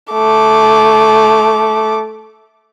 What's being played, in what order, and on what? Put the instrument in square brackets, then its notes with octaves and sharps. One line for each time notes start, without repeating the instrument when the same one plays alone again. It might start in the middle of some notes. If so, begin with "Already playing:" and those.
[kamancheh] A3 D6